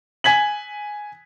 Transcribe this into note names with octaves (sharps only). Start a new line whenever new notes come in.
G#5 G#6 B6 F#7